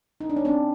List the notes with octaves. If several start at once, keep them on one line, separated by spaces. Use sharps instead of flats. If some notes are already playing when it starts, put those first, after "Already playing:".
D#4
D4
C#4
C4 D4